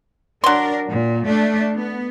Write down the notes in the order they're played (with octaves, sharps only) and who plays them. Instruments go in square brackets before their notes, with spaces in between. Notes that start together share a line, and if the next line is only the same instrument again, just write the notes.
[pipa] F#3 C6 [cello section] D4 A#4
[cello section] A#2
A3 D4
B3